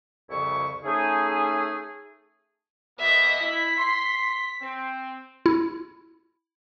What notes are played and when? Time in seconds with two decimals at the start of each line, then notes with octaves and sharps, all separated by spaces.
0.30 C2 F2 C#3 E4 C#6
0.85 A3 C#4 D#4 G#4
2.99 B2 A#3 B3 D#5 E5
3.41 E4 B6
3.78 C6
4.62 C4
5.46 E4